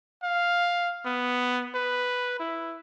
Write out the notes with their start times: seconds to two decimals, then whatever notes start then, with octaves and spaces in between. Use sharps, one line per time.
0.23 F5
1.05 B3
1.75 B4
2.40 E4